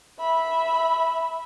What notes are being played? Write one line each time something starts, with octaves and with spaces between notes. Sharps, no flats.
E5 B5